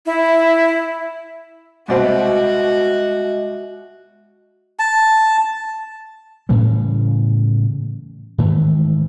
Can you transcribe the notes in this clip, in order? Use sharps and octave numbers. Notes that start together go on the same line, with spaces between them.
E4
C2 B2 G#3 C4 F#4 D#5 E5
A5
A2 C#3 E3 G3
G#2 D#3 E3 A3